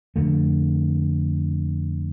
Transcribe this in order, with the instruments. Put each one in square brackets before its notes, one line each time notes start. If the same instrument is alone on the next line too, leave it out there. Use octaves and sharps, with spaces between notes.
[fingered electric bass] F2 D3 A3